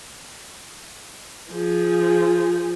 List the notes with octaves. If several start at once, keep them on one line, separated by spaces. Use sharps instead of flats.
F3 G#4